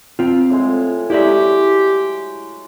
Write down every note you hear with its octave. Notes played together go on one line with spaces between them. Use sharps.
C4 F4
A2 G#3
F#3 G#3 E4 G4 D5 E5